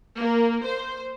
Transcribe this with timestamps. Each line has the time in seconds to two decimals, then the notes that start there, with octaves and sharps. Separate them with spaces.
0.19 A#3
0.64 C5